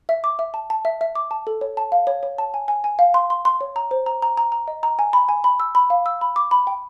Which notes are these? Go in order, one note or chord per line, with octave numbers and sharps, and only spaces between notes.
E5
D6
E5
A5
A5
E5
E5
D6
A5
A4
C#5
A5
F5
C#5
C#5
A5
G#5
G#5
G#5
F5
C6
C6
C6
C#5
A#5
C5
A#5
A#5
A#5
A#5
D#5
A#5
G#5
B5
G#5
B5
E6
B5
F5
E6
B5
D6
B5
G5